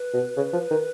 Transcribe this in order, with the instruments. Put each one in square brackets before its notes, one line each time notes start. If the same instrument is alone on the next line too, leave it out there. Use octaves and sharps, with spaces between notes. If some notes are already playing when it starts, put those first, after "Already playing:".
Already playing: [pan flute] B4
[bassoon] B2
C#3
F3
D#3